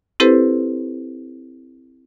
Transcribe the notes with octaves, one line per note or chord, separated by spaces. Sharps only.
C4 E4 G4 A4 B4 C5